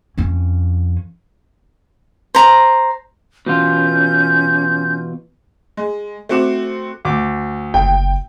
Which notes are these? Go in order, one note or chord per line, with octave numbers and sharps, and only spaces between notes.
F2 C#4
C5 A#5
B2 E3 C#4 F4 G6
G#3
A3 C4 F#4 D6 E7
D2 D6
F#1 G5